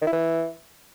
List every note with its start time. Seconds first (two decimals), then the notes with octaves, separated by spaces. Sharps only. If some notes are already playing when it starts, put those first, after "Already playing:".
0.01 D#3
0.07 E4
0.12 E3